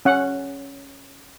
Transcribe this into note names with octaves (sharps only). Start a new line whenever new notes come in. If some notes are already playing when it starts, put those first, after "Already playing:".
C#4 F#5